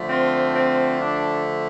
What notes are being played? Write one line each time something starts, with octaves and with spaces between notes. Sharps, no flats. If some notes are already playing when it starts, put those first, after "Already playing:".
Already playing: D3 F3 A3
C4 F4
C4 F4
D4